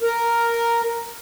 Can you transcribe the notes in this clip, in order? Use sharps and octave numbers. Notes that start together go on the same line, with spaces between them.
A#4